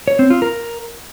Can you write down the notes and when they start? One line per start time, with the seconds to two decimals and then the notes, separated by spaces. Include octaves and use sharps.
0.08 C#5
0.19 C4
0.30 F4
0.42 A#4